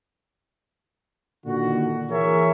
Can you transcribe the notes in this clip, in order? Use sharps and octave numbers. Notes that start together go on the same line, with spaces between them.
A#2 D3 D#3 F#4
E3 G#4 A#4 C#5 E5